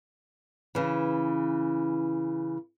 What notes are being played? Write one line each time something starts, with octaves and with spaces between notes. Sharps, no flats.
C#3 E3